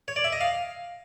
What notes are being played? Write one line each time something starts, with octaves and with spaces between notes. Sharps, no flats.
C#5
D5
E5
D#5
F5